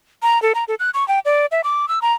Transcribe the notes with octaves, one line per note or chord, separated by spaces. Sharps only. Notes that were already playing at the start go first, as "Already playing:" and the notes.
A#5
A4
A#5
A4
F#6
C#6
G5
D5
E5
D6
E6
A#5